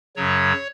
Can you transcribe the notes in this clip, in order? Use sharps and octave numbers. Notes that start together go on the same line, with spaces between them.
F#2 C#3 F#3 C#5